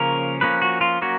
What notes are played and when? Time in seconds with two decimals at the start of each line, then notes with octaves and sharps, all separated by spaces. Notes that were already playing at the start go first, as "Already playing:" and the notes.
Already playing: C#3 F3 A#3 C#4 A#4
0.41 F3 A#3 C#4 B4
0.62 F#4
0.81 F4
1.01 F#3 A#3 C#4 F#4